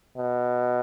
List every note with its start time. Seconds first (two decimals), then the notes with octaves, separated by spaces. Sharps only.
0.17 B2